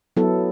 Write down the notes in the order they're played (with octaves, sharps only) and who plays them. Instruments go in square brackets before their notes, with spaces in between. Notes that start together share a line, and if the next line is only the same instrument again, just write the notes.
[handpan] F#3 B3 E4 A4